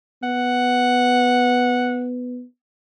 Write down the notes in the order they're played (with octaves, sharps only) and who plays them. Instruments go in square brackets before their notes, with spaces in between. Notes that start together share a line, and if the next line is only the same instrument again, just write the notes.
[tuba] B3 [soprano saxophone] F#5